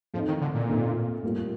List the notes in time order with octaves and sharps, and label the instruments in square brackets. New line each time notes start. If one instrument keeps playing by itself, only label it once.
[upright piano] A2 A3 C4 D#4 [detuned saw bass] F3
[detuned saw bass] D#3
D3
A#2
[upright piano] A2 A3 C4 D#4
A2 G3 A#3 F4